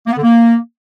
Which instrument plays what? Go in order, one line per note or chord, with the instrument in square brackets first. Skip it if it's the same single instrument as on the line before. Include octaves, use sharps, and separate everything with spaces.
[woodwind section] A#3
B3
D3
A#3